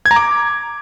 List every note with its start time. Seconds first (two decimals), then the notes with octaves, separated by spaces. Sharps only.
0.06 G#6
0.11 A#5
0.16 D6